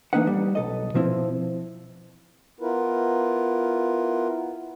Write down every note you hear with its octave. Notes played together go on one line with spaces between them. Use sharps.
E3 A#3 D4 D#4 B4 F#5
G3
B1 A4 D#5
B2 F3 C4 E4
B3 E4 F4 A#4 B4